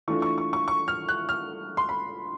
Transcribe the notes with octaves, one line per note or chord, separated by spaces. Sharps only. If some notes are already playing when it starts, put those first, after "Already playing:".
E3 A3 D4 F4 C#6
C#6
C#6
C#6
C#6
F6
F#6
F6
C6
B5